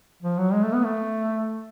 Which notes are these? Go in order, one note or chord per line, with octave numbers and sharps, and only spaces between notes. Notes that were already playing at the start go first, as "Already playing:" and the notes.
F3
F#3
G#3
A3
B3
A3